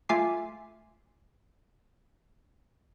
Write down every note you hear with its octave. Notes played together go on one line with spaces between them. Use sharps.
A3 F4 E5 G#5 D6 C7